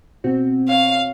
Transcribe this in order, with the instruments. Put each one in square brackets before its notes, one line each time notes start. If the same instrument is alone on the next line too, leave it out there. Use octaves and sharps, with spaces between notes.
[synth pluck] B2 C4 F#4
[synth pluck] C#5 [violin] F5